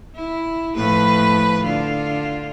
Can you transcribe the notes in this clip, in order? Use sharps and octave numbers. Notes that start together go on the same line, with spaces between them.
E4
A2 F3 B4
D3 F4